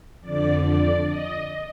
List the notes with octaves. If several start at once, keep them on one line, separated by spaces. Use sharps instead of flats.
F2 D3 D5
D5
D#5